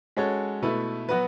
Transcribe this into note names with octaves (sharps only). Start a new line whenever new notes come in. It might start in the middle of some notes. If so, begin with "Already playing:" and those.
G#3 C#4 F#4 A4 C#5
B2 A3 E4 B4
F#3 B3 F#4 B4